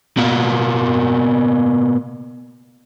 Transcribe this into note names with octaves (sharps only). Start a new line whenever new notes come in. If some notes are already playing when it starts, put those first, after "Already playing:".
B2 A#3